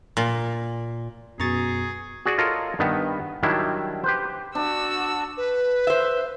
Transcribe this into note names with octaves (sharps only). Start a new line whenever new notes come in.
A#2
F#2 B2 G#4 A#5 C#6 A6
F#4 G#4 D5
F4 A4 A#4 C#5 D#5
G2 D#3 B3
D#3 F#3 G3 D4 E4
G4 B4 C5
D4 F#4 E6
B4
C5 E5